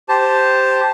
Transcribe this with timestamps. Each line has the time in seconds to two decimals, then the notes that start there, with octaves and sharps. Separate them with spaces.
0.09 G4 C5 A5